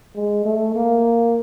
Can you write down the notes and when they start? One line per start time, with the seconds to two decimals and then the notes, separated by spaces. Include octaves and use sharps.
0.15 G#3
0.45 A3
0.76 A#3